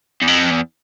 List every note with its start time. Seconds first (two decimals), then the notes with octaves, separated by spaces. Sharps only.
0.22 E2
0.28 F2
0.51 E2